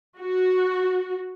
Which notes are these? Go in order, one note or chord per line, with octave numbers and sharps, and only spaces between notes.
F#4